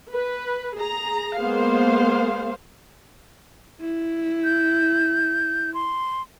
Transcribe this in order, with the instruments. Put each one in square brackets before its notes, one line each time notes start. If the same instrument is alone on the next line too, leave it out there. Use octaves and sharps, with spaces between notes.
[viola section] B4
G#4 A#5
G#3 A#3 B3 G#4 C5 F5
[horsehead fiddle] E4
[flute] G6
C6